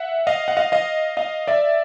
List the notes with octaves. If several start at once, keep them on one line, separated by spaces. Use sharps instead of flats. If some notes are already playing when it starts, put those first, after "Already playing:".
Already playing: E5 F#5
D#5 F5
F#5
D#5 F5
D#5 F5
D#5 F5
D5 E5